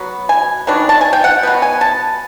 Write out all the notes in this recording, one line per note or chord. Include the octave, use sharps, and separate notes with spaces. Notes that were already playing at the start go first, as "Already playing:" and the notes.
Already playing: F#3 B3
G#5
D#3 F#3 B3 D4
A5
G#5
G5
F#5
B2 F#3 B3
G#5
A5